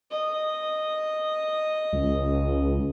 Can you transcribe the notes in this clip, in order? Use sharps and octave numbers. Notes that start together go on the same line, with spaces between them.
D#5
C#2